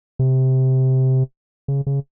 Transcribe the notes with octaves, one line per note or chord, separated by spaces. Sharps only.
C3
C#3
C#3